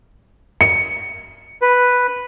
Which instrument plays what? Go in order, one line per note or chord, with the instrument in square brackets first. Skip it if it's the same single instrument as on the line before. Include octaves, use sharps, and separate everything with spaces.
[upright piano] C#7
[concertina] B4